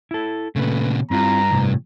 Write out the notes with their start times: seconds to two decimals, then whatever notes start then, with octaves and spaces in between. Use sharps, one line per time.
0.11 E4 A4
0.56 A#2 C#3 A3 B4
1.11 G2 C4 E4 F4 A#5
1.50 A2 C3 F3